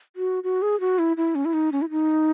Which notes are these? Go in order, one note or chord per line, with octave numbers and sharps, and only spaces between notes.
F#4
F#4
G#4
F#4
E4
E4
C#4
E4
D#4
C#4
E4
D#4